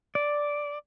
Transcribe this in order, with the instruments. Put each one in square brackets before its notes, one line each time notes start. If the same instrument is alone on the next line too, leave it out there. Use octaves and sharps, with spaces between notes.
[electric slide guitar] D5